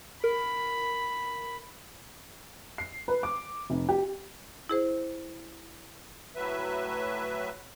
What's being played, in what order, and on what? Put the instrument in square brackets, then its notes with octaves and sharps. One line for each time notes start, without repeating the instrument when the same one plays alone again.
[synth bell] A#4 [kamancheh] B5
[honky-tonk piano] C7
B4
D6
F1
G4
[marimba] E4 G#4 C5
[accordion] A2 F#3 B4 E5